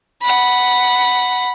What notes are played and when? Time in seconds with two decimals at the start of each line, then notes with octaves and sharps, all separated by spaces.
0.22 F#5 B5